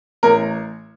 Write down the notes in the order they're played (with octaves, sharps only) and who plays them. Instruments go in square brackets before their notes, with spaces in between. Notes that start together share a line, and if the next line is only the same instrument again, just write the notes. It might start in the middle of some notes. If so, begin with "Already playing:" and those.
[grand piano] A1 A#4